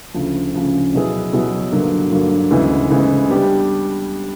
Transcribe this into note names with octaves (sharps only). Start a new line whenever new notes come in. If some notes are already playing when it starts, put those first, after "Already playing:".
D2 C#3 F3
D2 C#3 F3
B2 F#3 B3 E4 G#4
B2 F#3 B3 E4 G#4
G2 D3 F#3 A#3
G2 D3 F#3 A#3
D2 C#3 E3 G#3 B3
D2 C#3 E3 G#3 B3
G3 B3 D4 G4